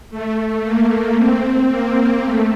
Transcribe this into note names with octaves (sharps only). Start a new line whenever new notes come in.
A3
A#3
C4
A#3
A3